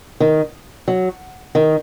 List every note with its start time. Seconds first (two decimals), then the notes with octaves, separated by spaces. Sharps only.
0.20 D#3
0.88 F#3
1.55 D#3